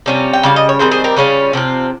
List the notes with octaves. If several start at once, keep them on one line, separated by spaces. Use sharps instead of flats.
C3 G3 C#4 F4
G5
C#3 G3 F5
D#5
C#5
D#3 G3 C4 G#4 C5
G#4 C5
G4 A#4
C#3 G3 C#4 F4
C3 F3 C4 F4